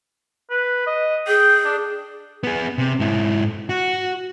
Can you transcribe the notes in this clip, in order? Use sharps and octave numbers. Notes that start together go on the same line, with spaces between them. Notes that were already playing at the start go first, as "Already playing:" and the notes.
B4
D#5
G#4 G5
D4
B3 G#4
C3
G#2 E4
F#4